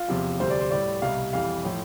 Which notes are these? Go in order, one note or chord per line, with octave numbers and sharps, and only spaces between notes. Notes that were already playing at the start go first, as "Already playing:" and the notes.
Already playing: F4
E2 C3 F3
D2 C3 G3 C5
D5
C5
A2 G3 D5
C2 B2 G3 F5
F2 E3 G3 F5
A2 F3